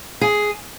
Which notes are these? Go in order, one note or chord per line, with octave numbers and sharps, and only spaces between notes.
G#4